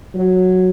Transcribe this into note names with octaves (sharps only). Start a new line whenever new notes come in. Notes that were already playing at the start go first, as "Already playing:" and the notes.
F#3